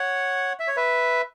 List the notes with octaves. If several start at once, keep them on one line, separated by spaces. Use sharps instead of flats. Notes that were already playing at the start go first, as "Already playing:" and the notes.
Already playing: C#5 F#5
E5
C#5
B4 E5